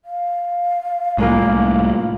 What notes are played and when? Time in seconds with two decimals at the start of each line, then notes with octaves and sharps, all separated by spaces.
0.05 F5
1.18 C2 A2 G#3 A#3 F4